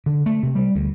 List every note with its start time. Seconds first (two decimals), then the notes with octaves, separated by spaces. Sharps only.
0.06 D3
0.26 A3
0.43 C3
0.55 G3
0.75 D2